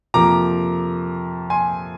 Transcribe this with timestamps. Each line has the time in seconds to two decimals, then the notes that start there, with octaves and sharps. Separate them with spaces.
0.14 F2 C3 F3 A#3 A#5 D6
1.50 G#5 C6